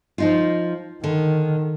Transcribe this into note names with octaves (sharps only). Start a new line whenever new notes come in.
F3 D#4 F4
D3 D#3